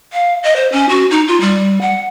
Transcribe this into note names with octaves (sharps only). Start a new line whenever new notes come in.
F5
D#5
C5
C#4
F#4
D#4
F4
G3
F#5